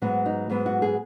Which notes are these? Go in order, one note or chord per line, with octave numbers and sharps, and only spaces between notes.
G#2 F#3 B3 F#4
D#4
G#2 F#3 B3
F#4
G#4